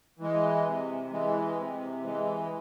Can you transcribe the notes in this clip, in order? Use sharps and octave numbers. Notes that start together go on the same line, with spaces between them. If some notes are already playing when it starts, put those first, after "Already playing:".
E3 G#3
C3
E3 G#3
C3
E3 G#3